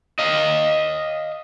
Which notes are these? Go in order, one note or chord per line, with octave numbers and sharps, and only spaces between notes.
D#5 F5